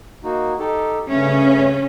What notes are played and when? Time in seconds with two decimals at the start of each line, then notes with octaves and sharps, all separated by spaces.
0.24 A#3 D#4 F#4
0.59 D#4 G4 A4
1.09 G2 C#3 A3 C#4